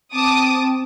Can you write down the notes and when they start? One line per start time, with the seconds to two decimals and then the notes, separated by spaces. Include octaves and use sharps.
0.13 C4 A5 D6 D#6